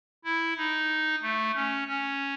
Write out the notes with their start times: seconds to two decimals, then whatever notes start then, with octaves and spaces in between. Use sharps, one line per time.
0.24 E4
0.57 D#4
1.22 A3
1.55 C#4
1.88 C#4